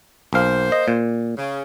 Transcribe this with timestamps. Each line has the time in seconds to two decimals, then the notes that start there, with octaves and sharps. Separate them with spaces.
0.33 B1 A#3 C5 F5
0.72 D#5
0.88 A#2
1.38 C#3